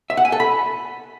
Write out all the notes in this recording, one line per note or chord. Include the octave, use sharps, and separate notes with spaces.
E5
F#5
G#5
A4
B5